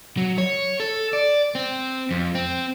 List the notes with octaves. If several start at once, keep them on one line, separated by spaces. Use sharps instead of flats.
F#3
C#5
A4
D5
C4
F2
C4